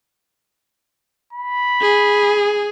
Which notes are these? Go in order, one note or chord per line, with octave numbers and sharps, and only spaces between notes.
B5
G#4